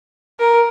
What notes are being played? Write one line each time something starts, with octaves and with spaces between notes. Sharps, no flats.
A#4